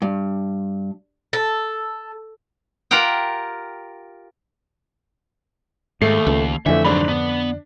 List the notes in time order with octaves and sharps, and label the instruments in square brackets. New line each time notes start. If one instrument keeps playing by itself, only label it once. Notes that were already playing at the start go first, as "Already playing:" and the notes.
[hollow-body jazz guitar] G2
[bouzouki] A4
[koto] F4 G4 A#4 F#5 G5
[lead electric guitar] D#2 [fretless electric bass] G#2 [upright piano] A3 C7
[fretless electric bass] C#2
[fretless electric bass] F2 D3 [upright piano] E3 A3 [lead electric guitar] E5
[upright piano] G#2 D4 B5 [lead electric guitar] E3 F#3
[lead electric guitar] B3 [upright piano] D4